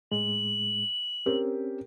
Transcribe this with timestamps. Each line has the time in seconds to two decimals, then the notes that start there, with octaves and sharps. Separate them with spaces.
0.12 A2 G#3 F#7
1.26 C4 C#4 G4 A#4